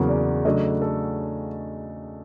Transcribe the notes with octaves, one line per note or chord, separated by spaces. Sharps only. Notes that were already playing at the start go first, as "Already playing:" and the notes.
Already playing: E2 C#3 F#3 A#3
D5
C#3 F#3 A3 D4 D#5
A4